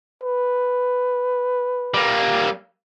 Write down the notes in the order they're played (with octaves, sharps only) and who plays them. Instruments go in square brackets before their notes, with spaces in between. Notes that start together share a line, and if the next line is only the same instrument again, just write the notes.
[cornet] B4
[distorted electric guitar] G3 A#3